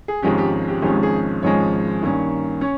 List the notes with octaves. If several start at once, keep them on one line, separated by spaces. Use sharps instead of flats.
G#4
G#1 G#2 F3 G#3 C#4 G4
G4
G4
G#1 G#2 F3 G#3 C#4 G4
G#4
G#1 G#2 F3 G#3 C#4 C#5
G2 D#3 A#3 C#4
C#4 C#5